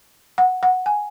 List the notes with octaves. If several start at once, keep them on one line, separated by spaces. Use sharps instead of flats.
F#5
F#5
G#5